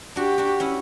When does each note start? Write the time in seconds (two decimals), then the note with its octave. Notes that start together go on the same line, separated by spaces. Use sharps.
0.16 D4 F#4 G4
0.38 D4 F#4
0.60 C#4 E4